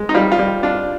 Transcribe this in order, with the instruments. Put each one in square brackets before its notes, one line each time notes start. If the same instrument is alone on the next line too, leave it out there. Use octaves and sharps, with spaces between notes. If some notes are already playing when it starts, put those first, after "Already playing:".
Already playing: [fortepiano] G#3
D#4
G3 F4
F4
G3
D4 F4